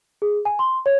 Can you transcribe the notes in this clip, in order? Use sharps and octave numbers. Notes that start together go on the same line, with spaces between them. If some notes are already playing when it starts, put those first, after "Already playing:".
G#4
G#5
C6
C#5